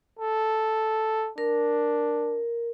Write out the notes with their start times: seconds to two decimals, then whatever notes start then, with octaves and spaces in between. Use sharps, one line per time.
0.19 A4
1.38 D4 A#4